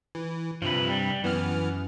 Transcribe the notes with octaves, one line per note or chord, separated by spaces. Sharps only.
E3
G2 C3 F3 B4
G3
F#2 E3 B3 F6